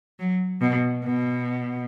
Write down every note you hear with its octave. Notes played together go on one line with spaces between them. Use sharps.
F#3
B2
B2